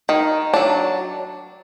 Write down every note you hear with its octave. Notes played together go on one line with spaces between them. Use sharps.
D#3
F#3 D4